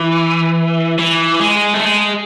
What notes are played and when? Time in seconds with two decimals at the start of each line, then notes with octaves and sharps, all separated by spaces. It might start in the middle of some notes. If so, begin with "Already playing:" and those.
Already playing: E3
0.99 E3
1.41 G#3
1.74 A3
1.84 G#3